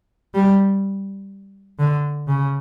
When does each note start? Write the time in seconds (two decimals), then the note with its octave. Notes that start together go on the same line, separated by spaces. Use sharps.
0.35 G3
1.79 D3
2.28 C#3